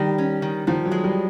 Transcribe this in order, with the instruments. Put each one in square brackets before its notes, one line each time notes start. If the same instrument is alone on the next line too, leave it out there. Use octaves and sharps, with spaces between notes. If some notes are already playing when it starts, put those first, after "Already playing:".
Already playing: [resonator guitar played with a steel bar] D#3 [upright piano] G3
[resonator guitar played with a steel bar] C#4
D#3
[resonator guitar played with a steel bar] D#3 [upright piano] F3
[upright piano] F#3
[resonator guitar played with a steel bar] G#3
[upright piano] G3